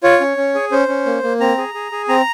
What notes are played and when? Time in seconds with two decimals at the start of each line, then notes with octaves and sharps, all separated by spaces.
0.03 F4 C#5
0.21 C#4
0.37 C#4
0.55 G#4
0.72 C#4 C5
0.88 C#4
1.06 A#3
1.23 A#3
1.40 C4 A#5
1.58 G#4
1.74 G#4
1.92 G#4
2.09 C4 A#5